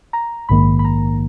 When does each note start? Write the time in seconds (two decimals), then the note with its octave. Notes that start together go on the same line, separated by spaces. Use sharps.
0.13 A#5
0.49 A#1 G#2 D#3 A#3 B5
0.79 B5
0.85 A#5